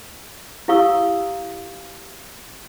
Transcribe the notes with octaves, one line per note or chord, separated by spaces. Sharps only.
E4 G4 F5 C#6 D#6 E6